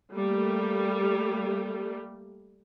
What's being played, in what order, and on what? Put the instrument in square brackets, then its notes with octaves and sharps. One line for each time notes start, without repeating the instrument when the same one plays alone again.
[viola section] G3 A3 A#3